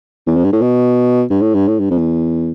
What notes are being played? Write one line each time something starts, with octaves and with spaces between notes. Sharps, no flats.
E2
F2
G2
A2
B2
G2
A2
G2
A2
G2
F2
E2